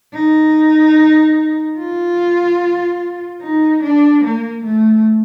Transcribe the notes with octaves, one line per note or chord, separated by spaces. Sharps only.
D#4
F4
D#4
D4
A#3
A3